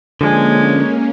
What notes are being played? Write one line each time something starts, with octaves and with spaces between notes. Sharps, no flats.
D3 F3 G#3 A#3 C#4 D4 G#5